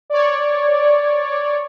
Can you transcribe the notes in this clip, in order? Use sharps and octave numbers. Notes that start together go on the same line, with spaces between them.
C#5 D5